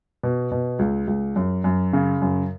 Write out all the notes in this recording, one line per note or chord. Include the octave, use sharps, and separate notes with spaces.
B2
B2
C#2
C#2
F#2
F#2
C#3
F#2